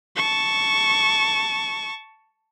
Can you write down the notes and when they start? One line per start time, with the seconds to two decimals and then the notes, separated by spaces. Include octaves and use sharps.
0.16 A5 C#6